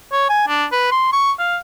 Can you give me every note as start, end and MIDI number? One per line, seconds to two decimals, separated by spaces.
0.12 0.28 73
0.30 0.48 80
0.48 0.65 62
0.72 0.91 71
0.92 1.11 84
1.13 1.32 85
1.39 1.57 77